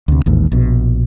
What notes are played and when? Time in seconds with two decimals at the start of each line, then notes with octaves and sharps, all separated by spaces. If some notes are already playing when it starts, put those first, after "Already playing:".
0.08 D2 C3
0.26 A1 D#2 G#2
0.52 A#1 B2